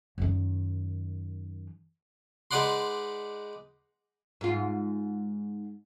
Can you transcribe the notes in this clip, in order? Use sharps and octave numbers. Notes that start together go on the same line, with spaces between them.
F#2 D#3
G#3 D#4 B4 D5 F#5 C6
G#2 F4